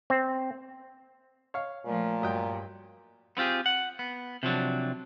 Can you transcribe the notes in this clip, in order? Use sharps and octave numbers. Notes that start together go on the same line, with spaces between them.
C4
C#5 F5
A#2 F3 A3
G2 F#3 D#5 G5
B3 C4 F4 G4 G#4
F#5
B3
C3 F3 F#3 D4